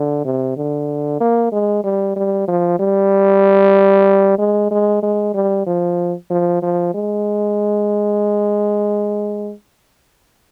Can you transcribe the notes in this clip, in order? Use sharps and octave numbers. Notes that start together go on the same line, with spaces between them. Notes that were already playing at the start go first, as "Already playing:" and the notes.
Already playing: D3
C3
D3
A#3
G#3
G3
G3
F3
G3
G#3
G#3
G#3
G3
F3
F3
F3
G#3